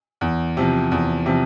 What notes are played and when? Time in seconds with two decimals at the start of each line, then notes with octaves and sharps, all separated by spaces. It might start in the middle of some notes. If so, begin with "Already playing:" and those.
0.21 E2
0.57 C3 F3
0.92 E2
1.26 C3 F3